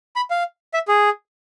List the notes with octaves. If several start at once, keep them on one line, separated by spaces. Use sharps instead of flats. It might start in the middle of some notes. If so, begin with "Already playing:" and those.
B5
F5
E5
G#4